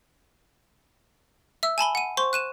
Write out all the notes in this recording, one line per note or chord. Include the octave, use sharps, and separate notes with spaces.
E5 E6
G#5 A5 B5 G7
F#5 D#7
C5 C6 C#6
F#6 D#7 E7